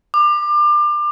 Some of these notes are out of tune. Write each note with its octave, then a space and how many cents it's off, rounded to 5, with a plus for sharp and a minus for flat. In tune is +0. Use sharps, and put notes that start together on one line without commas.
D6 +30